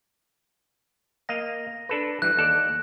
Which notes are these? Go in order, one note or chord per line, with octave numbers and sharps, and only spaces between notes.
A#3 D#5 F5 A#6
D4 A4 B4
E3 G3 F#6
D#2 A4 D5